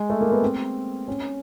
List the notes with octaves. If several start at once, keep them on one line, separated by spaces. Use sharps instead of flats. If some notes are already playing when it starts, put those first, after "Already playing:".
Already playing: G#3
A3
A#3
B3
C4
C#4